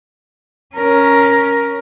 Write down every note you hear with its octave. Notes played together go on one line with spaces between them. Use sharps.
C#4 A#4